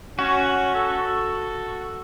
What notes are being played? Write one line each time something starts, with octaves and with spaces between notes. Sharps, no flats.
C#4 F#4
A4